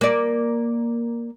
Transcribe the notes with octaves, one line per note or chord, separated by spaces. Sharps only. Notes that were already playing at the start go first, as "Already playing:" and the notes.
A#3 D5